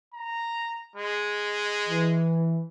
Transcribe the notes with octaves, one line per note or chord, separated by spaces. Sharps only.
A#5
G#3
E3